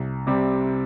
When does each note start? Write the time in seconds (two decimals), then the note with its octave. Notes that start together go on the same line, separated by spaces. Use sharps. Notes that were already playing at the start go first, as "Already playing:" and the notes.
Already playing: C2
0.27 C3 G3 C4 G4